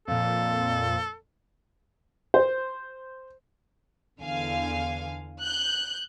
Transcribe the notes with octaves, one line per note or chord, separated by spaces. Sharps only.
F2 A#2 A4 F5
C5
E2 D3 F5 G#5
F#6 G6